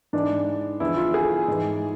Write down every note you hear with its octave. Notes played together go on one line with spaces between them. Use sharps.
G#2 E3 D4
E2 D3 F3 E4
F4
G#4
G#2 E3